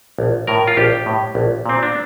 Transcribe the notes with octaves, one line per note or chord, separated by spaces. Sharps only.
A#1
A2 A#4
F4
A#1 G4
A2
A#1
A#2 C4
D4